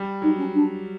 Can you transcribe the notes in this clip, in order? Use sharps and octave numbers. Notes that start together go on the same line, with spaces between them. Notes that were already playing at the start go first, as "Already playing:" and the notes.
Already playing: G3
F#3 D#4
C#4
D4